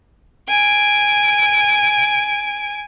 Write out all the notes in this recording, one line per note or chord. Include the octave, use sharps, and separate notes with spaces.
G#5 D7